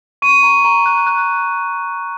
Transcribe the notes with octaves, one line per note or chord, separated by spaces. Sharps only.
C#6 D#7
A#5
A#5
F#6
F#6